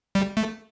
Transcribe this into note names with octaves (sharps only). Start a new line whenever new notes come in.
G3
A3